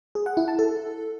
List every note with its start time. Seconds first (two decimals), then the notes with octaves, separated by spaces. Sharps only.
0.15 G#4
0.26 F#5
0.37 E4
0.48 A5
0.59 A4